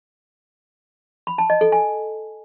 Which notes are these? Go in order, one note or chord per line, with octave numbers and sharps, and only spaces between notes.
B5
A5
D#5
A4
G#5